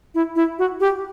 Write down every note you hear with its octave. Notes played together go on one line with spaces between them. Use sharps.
E4
E4
F#4
G4